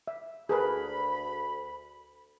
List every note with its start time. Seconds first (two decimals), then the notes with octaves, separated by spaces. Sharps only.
0.08 E5
0.49 D2 G#4 A#4 B4 B5